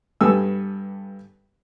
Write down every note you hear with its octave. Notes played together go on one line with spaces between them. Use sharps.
G2 B3 G4 A4 G#5 E6